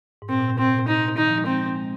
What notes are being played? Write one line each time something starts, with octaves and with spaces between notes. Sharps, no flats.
G#2
A#2 C4
A#2
C3
A#2 C4
A#2
C3 D#4
D#3 D#4
F3
G#3
F3 C4
G#3